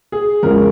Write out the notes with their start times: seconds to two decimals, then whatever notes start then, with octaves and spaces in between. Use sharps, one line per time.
0.12 G#4
0.43 E2 C#3 F3 G#3 A#4